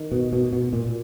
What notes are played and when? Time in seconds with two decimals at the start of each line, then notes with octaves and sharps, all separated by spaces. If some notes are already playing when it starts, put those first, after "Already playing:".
Already playing: D#3
0.12 B2
0.33 B2
0.53 B2
0.73 A#2